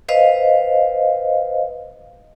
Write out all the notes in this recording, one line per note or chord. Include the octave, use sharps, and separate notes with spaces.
B4 C5 D#5 F5